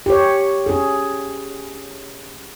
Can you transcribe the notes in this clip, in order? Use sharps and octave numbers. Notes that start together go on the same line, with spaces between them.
G4 C#5
C#4 G#4